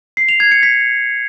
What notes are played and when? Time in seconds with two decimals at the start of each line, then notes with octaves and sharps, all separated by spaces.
0.17 C7
0.29 F7
0.40 G#6
0.52 C#7
0.63 B6